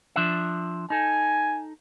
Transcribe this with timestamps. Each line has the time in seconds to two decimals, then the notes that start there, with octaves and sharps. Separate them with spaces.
0.16 F3 D4 E5
0.90 D#4 A4 G#5